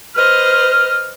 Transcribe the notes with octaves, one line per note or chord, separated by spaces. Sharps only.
B4 C5 D#5 F6